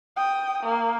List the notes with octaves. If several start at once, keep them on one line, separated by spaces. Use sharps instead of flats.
G5 D#6
A#3